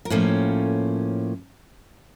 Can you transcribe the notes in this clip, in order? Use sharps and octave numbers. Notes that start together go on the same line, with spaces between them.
A#4
A2 F3 A#3 C#4 A4